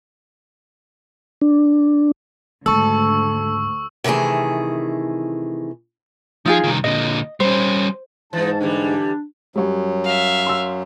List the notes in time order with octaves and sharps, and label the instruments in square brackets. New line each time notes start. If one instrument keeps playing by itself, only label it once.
[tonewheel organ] D4
[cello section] D2 [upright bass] G#2 D#3 [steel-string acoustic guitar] A4 [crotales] C#6 E6
[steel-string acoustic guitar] C3 D#3 E3 A3 G#4
[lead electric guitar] F3 [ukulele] D#4 F4 G#4
[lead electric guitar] C2 D#3
[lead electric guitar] A#2 D3 [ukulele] D#5
[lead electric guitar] G3 C#4 [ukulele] C5
[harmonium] G#2 [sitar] E3 D#4 [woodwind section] A5
[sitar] D3 E3 G3 [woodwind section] D4
[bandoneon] F#2 F#3 [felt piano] G3 C#5
[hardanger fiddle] E5 F5
[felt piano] C6 E6